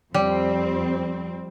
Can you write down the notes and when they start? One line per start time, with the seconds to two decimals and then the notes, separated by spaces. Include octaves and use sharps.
0.14 F2 G3 C4